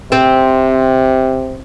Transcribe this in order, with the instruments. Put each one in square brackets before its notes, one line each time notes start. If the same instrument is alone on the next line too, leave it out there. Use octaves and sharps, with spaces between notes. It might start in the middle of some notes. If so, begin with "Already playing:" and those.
[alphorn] C3 [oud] C4